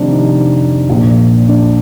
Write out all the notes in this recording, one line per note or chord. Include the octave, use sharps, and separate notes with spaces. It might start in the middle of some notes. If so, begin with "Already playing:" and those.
Already playing: F1 F2 C3 D#3 D4 D#4
D#4
A#1 A#2 F3
D4